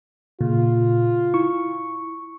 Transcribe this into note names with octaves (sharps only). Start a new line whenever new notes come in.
A#2 C#3 F4
E4 C#6